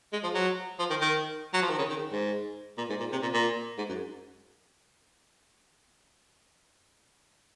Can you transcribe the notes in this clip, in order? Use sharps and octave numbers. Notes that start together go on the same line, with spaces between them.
G#3
F3
F#3
F3
D#3
D#3
F#3
F3
D#3
C#3
D#3
G#2
A#2
G#2
A#2
C3
A#2
A#2
G#2
F#2